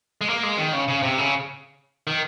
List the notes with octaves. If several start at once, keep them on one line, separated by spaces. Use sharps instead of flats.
G#3
A#3
G#3
D#3
C#3
C#3
C3
C#3
D#3